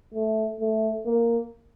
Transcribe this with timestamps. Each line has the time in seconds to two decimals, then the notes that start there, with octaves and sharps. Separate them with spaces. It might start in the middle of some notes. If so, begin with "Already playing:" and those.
0.14 A3
0.61 A3
1.06 A#3